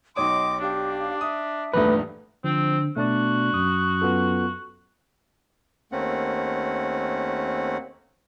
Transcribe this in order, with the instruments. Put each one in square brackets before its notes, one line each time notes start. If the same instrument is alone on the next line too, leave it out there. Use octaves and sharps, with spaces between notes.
[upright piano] B1 C#5 D#6 [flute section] D#5 G5 C6 [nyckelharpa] D6
[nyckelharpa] D4 [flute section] G4 F5 D6
[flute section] E5 [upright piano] D#6
[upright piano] A#1 E2 G2 [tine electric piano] A3 B4 [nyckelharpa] D#4
[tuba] D3 [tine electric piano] F3 [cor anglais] C4
[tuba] B2 [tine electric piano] A3 D4 D5 [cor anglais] F#4
[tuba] F#2 [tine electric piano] D#6
[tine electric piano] B3 F4 A4
[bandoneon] D#2 A3 A#3 C4 C#4 F#5